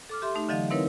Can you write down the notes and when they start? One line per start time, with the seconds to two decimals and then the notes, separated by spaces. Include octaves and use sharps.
0.09 A4 D6 F6
0.22 G4 A4 E5 C6
0.35 A3 D#4
0.49 D3 E3 F#3 D#5 F5
0.70 C4 D#4 E4 A#4 B4 C#5